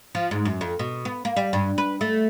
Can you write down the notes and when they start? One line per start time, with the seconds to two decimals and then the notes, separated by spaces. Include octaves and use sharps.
0.15 F3
0.31 G#2
0.45 F#2
0.61 F2
0.79 B2
1.05 B3
1.25 A#3
1.36 G3
1.53 G2
1.78 B4
2.01 A3